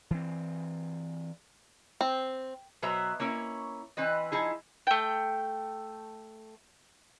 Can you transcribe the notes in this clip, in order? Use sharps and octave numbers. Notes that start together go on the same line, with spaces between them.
E3 C4
C4
B2 F#3 B4 C5 E5 A#5
A#3 C#4 E4 C#5
E3 C4 B4 D#5
F3 D#4 E4 G#4
A3 G5